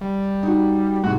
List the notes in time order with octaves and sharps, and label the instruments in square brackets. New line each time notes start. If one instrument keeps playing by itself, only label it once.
[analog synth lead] G3
[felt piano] D#4 F#4
[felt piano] C2 G#2 [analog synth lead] F#4